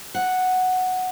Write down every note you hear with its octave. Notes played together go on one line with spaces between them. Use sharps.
F#5